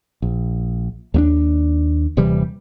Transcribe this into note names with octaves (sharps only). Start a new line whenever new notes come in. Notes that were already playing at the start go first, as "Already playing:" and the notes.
A#1
D#2 A#3 D4
D#1 C3 E3 G3